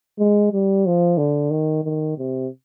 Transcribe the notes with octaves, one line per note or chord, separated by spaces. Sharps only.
G#3
G3
F3
D3
D#3
D#3
C3